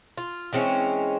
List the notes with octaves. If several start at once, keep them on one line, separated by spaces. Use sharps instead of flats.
F4
E3 G#3 C4 C#4